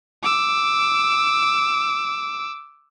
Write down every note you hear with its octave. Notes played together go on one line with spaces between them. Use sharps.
D6 E6